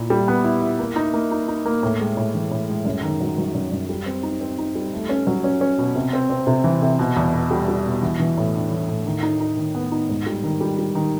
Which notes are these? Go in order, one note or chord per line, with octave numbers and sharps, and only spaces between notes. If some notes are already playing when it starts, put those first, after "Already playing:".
Already playing: A#2 E4
G3
B3
E4
E4
A#3
D#4
A#3
D#4
D#4
A#3
A2
G#3
A2
E3
A2
G#3
F#2
D#3
F#3
F#3
F#2
F#2
G3
C4
D#4
C4
D#4
G3
A3
C#4
F#3
C#4
C#4
B2
C3
C4
C4
C3
E3
C3
B2
E2
B2
G3
G3
B2
E3
E3
A2
D4
E3
A2
D#3
D#4
D#4
D#3
B3
D#4
G#2
G3
D#3
G3
G3
D#3